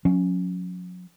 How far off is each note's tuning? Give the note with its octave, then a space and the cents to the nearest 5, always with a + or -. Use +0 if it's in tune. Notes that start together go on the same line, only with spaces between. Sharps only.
F#3 -40 C#4 +0